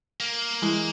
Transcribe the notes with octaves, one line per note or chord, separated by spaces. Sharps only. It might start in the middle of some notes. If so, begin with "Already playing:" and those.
A#3
E3 G#3